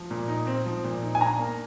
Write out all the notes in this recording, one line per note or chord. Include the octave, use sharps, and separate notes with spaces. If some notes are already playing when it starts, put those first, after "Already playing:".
Already playing: F3
A#2
D#4
C4
F3
A#2
D#4
G#5
D4 A#5
A#3